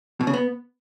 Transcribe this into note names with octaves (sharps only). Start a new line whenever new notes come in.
B2
C#3
B3